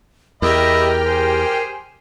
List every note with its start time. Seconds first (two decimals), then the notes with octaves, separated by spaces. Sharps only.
0.42 E2 G4 A#4 D#5 E5 G5 B5 F6
1.05 G#4 C5